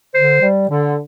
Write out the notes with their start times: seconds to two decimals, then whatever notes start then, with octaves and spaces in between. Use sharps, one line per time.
0.14 D3 C5
0.41 G3
0.70 D3